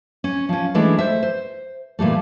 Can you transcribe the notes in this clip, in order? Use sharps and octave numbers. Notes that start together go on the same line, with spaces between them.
C#4
F3 C#4
E3 G#3 A3 C#4 D4 E4
A4 C5 E5
C5
A#2 E3 G3 A3